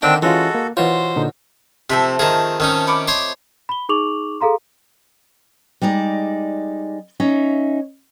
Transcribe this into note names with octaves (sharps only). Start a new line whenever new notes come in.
D3 D#3 A3 C4 D4 G5
E3 G#3 C#4 F4 F#4 A4
A#3
B2 E3 F4 C5 C#5
A#2 D3 D#4
C3 F3 A3 C4 E5
D#3 F4 G#4 A5 A#5
D#3 C#4 D#4 A4
B5 C#6 D6
C5 C#5 D#5
B5 G7
D#4 G#4 C#6 D6 F7 F#7
G#4 A4 F5 A#5 C6
G3 G#3 D#4 D5
C#4 D#4 E5